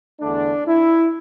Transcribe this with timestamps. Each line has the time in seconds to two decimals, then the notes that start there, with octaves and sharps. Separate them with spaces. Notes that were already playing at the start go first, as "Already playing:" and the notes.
0.20 E2 D3 A3 D4
0.67 E4